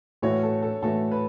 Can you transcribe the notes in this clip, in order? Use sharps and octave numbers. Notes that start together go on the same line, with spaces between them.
A2 E3 A3 F#4 C#5
A4
A4
A2 E3 A3 F#4 A4
B4